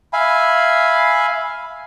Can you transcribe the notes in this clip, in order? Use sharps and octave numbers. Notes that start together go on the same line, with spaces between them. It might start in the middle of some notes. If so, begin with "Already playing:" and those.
E5 F5 G#5 B5